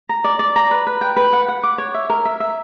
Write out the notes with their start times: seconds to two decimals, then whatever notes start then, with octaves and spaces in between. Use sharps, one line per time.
0.09 A#5
0.24 D5
0.39 D5
0.56 A#5
0.71 B4
0.87 B4
1.01 G5
1.16 B4
1.33 F#5
1.48 F#5
1.63 D6
1.78 C#5
1.94 E5
2.10 A#4
2.25 E5
2.40 E5